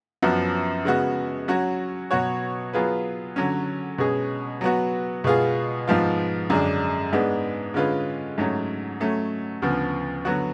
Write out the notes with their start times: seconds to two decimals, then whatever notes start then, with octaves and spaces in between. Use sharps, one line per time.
0.22 F#2 F3 B3 F#4
0.85 C#3 G#3 B3 F#4
1.48 F#3 C#4 F#4
2.11 B2 F#3 B3 F#4 C#5
2.73 F#3 B3 F4 G#4 B4
3.36 D3 F#3 C#4
3.98 B2 G#3 C#4 G#4
4.61 F#3 B3 F#4
5.24 B2 G#3 B3 F4 G#4
5.87 G#2 F3 B3 F4
6.50 F#2 D3 G#3 D4 G#4
7.13 G#2 G#3 B3 D4
7.74 D3 G#3 C#4 F4 B4
8.38 G#2 F#3 A3 C#4
9.00 F#3 A3 C#4
9.62 D2 C#3 F3 B3
10.25 D3 F#3 B3 F#4